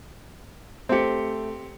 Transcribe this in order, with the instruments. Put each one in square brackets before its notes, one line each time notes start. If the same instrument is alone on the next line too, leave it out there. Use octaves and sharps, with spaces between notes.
[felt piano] A3 C#7 [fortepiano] C4 G4